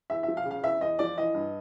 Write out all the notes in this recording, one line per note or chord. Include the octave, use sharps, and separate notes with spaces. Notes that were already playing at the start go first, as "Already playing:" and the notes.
E2 E5
E5
F3
F5
C#3
F5
E2 E5
E2 D#5
F3 D5
E3 D#5
G2